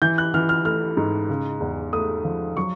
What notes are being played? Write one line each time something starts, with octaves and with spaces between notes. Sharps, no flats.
E3 G6
F#6
E3 F6
F6
A3 F6
G#2
C#3
E2
A3 D#6
F3
F#3 C#6